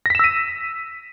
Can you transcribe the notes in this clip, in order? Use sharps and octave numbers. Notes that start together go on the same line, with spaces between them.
E6 A#6 B6 D#7 E7